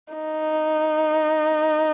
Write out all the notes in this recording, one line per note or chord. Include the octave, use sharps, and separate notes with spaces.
D#4